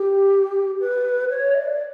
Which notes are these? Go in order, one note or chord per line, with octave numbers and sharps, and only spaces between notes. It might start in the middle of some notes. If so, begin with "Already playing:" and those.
Already playing: G4
B4
C#5
E5
D5